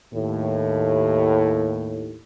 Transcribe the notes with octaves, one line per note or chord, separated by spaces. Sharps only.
D#2 A2